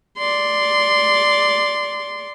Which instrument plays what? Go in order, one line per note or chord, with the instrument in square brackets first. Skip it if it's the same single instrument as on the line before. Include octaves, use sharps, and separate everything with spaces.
[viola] D5 C6